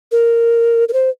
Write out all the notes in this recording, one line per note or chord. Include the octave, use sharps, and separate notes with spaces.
A#4
A#4
C5